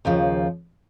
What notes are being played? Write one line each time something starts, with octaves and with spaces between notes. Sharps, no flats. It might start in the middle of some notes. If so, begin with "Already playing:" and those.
D#2 C#3 F3